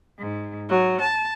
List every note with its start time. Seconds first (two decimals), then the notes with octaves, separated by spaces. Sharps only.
0.19 G#2
0.69 F#3
1.01 A5